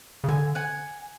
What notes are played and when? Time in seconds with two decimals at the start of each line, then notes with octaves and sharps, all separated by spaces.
0.24 C#3
0.28 D3 G#5
0.55 F#5 G#5